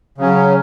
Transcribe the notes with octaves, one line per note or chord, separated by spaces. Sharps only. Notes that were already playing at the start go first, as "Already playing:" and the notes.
C#3 F#3 C#4